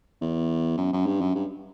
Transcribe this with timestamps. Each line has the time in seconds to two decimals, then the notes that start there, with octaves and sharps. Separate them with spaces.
0.21 E2
0.77 F#2
0.93 F#2
1.06 G2
1.21 F#2
1.35 G2